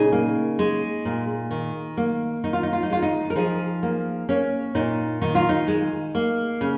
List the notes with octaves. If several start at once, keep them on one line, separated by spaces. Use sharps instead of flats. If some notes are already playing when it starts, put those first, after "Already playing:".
Already playing: A#2 C#3 D#4 G#4
A#3
G#3
A#2
D#3
A#3
D#3 D#4
F4
D#4
F4
D#4
G#3 F4
D#4
A#4
F3 D#4 G#4
A#3
A#3 C#4
A#2 D#4
D#3 D#4
F4
D#4
G#3
A#3
C#3